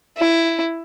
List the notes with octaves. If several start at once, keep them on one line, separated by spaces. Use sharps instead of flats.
E4